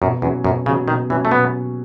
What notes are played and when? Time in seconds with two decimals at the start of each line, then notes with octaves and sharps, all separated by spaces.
0.02 F#2 B2
0.22 E2 F#3 C#4
0.44 F#2 B2
0.66 C#3 C#4
0.69 F#3
0.88 B2 D#3
1.10 E3 F#3 C#4
1.25 A3
1.31 B2 B3